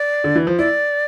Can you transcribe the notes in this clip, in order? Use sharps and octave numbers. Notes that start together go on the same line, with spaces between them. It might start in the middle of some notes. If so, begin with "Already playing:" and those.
Already playing: D5
D3
E3
F3
E4 D5